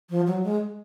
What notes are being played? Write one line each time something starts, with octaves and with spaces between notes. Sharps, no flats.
F3
F#3
G#3